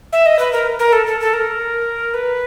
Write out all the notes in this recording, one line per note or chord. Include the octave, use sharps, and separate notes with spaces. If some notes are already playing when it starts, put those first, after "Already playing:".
E5
D#5
B4
A#4
A#4
A4
A4
A4
A#4
B4